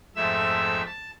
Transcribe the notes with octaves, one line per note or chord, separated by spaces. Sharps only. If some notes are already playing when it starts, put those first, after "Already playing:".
F2 G#2 A3 E5 E6
A5